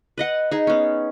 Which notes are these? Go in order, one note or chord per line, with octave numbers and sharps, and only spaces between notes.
B4 D#5 F#5
D#4 G#4
B3 C#4